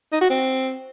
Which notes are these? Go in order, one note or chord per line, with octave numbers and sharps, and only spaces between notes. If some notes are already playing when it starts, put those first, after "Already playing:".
D#4
F#4
C4